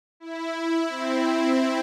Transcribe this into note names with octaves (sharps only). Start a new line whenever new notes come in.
E4
E4
C4